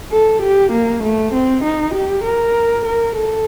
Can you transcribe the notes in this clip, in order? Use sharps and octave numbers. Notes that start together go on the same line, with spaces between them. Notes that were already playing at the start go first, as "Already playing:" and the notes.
A4
G4
A#3
A3
C4
D#4
G4
A#4
A#4
A4